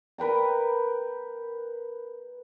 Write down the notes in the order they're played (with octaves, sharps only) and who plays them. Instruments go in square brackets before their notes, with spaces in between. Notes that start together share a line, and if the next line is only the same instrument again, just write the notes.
[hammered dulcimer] A#4 B4 G5 A#5